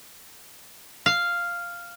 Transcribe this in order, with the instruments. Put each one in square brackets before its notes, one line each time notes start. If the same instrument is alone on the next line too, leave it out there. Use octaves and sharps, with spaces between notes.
[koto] F5